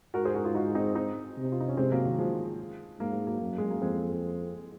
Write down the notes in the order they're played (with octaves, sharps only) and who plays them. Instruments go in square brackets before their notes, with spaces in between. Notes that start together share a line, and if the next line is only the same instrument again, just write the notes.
[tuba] G#2 [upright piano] F#4 A#4
[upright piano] G#4 C5
F#4 A#4
F4 G#4
D#4 F#4
C4 D#4
C4 D#4
[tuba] C3
[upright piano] F4
D#4
C#4
[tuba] C3 [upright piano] G#3 C4
[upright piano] F#3 A#3
D#3 F#3
F3 G#3
[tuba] G#2 [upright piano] A#3
[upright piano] G#3
F#3 A#3
[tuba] F#2
[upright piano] G#3
A#3
[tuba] F2 [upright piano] G#3 C4